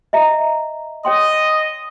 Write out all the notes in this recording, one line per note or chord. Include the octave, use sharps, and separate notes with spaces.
D#5 E5 A#5
C#5 D#5 G5 C6